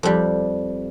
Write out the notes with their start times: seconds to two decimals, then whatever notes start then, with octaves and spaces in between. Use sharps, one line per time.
0.03 F2 G3